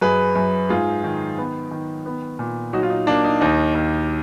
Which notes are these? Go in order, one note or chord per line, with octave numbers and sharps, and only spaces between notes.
F#2 G#4 B4
F#2
G#2 F4 G#4
D#3
B3
D#3
B3
A#2
F#3 D#4 F#4
F4
D#4
A#3 D4
D#4
D#2 D#4
D#2